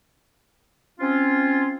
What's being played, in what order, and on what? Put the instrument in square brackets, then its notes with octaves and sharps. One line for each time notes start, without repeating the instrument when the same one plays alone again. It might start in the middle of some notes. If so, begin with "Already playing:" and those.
[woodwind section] C4 C#4 F4